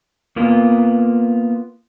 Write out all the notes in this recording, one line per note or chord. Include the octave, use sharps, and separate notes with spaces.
A#3 B3 F4